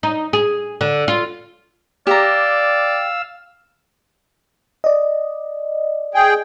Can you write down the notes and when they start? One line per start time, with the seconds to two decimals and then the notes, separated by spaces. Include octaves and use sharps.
0.03 D#4
0.33 G#4
0.81 D3
1.08 F4
2.07 G4 D5 F5 A#5 E6
4.84 D5 D#5
6.15 G#4 G5